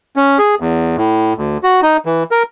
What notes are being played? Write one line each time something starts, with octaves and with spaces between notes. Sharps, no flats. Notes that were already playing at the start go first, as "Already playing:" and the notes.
C#4
G#4
E2
A2
D2
F#4
D#4
E3
A#4